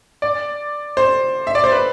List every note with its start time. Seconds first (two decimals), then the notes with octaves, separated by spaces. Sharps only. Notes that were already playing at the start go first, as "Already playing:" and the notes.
0.22 D5
0.97 C5
1.47 E5
1.55 D5
1.64 C5
1.72 B4